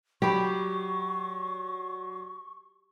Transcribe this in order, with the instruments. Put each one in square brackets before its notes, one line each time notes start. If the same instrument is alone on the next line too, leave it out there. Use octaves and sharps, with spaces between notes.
[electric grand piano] F#3 [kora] G4 [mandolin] D5 B5 [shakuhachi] C#6